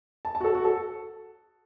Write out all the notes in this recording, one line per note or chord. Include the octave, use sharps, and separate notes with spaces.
A5
A5
F#4
A4
F#4
A4